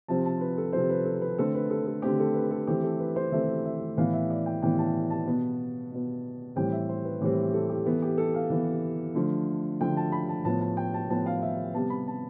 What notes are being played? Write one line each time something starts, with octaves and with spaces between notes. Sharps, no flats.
C3 F3 C4 A5
A5
B4
A4
C3 F3 C4 C5
B4
A4
B4
D3 A3 C4 A4
B4
A4
A4
D3 A3 C4 G4
A4
B4
A4
E3 A3 C4 G4
A4
B4
C5
E3 A3 C4 E5
E5
A2 E3 B3 F5
E5
D5
G5
A2 E3 B3 G5
A5
A5
B2 B3
B2 B3
A2 E3 G3 C4 G5
E5
C5
B4
A2 E3 G3 C4 G4
G4
A4
G4
E3 B3 A4
G4
A4
F5
E3 B3
D3 F3 A3
D3 F3 A3 G5
A5
B5
A5
A2 F3 B3 A5
A5
G5
A5
A2 F3 B3 A5
F5
E5
C3 G3 B3 A5
B5
A5